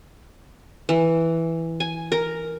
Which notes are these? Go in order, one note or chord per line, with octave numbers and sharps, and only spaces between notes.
E3
G#5
A#4